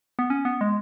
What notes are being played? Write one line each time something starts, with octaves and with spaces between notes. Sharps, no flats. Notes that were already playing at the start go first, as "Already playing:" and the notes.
B3
C#4
B3
G#3